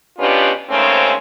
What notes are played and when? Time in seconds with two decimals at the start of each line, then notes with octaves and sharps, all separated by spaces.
0.18 B2 B3 C#4 D4 F4 G4
0.70 D#2 G#2 C#3 A3 C4 C#4